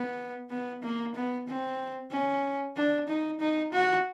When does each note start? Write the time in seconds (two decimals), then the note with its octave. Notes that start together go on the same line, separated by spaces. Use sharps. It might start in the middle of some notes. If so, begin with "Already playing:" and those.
Already playing: B3
0.50 B3
0.83 A#3
1.15 B3
1.48 C4
2.12 C#4
2.77 D4
3.08 D#4
3.40 D#4
3.73 F#4